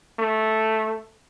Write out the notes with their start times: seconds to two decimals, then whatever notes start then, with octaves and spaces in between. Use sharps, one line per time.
0.19 A3